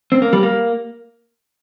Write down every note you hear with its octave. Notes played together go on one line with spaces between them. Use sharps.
C4
A#3
G3
A#3